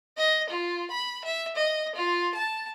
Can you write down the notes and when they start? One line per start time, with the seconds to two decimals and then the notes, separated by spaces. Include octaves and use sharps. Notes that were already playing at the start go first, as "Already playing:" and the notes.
0.18 D#5
0.50 F4
0.91 B5
1.24 E5
1.56 D#5
1.96 F4
2.35 A5